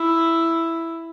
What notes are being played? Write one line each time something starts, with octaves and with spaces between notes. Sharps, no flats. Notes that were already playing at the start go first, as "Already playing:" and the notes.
Already playing: E4